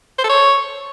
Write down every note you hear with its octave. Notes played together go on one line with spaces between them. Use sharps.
C5
A4
C#5